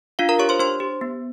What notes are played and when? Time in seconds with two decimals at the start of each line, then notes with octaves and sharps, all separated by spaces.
0.19 D4 F4 F5
0.29 A#4 A#5
0.39 G4 C#5 C#6
0.49 C5 C6
0.59 D4 C5 C6
0.80 G4
1.01 B3